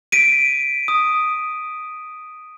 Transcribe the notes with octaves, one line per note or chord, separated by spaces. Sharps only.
B6 D7 D#7
D#6